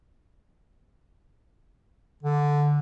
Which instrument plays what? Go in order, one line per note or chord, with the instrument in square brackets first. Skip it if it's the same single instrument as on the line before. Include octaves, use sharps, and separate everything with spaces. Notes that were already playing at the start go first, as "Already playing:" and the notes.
[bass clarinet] D3